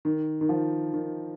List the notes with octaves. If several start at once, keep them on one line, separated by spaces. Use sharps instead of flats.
D#3
D#3
F3
D#3